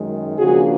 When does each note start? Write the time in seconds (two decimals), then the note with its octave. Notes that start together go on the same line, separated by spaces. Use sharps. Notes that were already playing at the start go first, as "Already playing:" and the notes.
Already playing: F#2 D#3 G#3
0.39 C#3 F3 A#3 D4 F#4 G#4